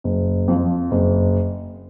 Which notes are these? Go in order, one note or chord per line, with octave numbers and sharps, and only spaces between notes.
F#1
F2 F3
F#1